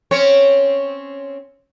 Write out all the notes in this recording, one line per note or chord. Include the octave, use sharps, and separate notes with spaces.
C4 C#4 C#5